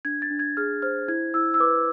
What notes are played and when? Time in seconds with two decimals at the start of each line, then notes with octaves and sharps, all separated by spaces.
0.05 D4 G#6
0.22 A6
0.30 D4
0.39 G#6
0.57 G#4 F6
0.82 C5 F6
1.08 E4 G#6
1.34 E4 E6
1.54 E6
1.60 B4 D6